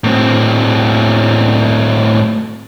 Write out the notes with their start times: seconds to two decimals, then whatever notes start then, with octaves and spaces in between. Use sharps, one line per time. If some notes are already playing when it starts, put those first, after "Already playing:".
0.04 A2 C4